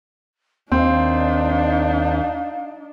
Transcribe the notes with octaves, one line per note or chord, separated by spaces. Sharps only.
D#2 C4 D4 D#4 F5